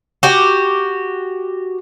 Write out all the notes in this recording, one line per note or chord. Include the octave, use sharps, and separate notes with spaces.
F#4 G4